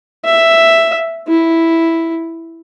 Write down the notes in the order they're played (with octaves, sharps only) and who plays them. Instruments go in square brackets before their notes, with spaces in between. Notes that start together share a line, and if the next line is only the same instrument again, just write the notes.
[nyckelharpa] E5
E4